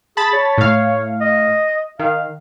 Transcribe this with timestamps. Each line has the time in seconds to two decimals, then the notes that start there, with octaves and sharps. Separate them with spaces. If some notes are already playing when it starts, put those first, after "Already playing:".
0.17 G#4 A5 B5 A6
0.33 C#5
0.58 A2 F5
1.21 D#5
1.99 D#3 F5